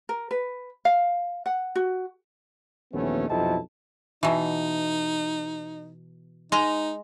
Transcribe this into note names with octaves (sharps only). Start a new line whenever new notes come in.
A#4
B4
F5
F#5
F#4
A#1 D#2 E3 A3 B3 C#4
B1 F2 C3 E4 D#5 A5
B2 E3 D#4
G#3 D#4 D#5 A#5